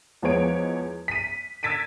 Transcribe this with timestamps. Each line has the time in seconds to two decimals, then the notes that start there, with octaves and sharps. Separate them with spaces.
0.22 E2 F3 G#3 B3 C#5 D7
1.08 B6 D#7
1.63 E6 G#6 A6 B6 D7 D#7